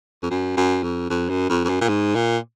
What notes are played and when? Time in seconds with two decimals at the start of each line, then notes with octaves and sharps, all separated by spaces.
0.23 F2
0.30 F#2
0.57 F#2
0.83 F2
1.10 F2
1.29 F#2
1.49 F2
1.65 F2
1.69 F#2
1.81 A#2
1.89 G#2
2.15 A#2